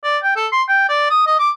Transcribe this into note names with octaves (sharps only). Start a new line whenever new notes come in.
D5
G5
A4
C6
G5
D5
D#6
D#5
D6